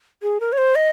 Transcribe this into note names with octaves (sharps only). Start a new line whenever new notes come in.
G#4
A#4
C#5
C5
D#5